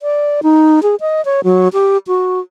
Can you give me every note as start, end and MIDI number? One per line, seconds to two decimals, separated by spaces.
0.01 0.41 74
0.43 0.82 63
0.83 0.95 68
1.01 1.24 75
1.25 1.41 73
1.44 1.68 54
1.73 1.98 67
2.07 2.40 66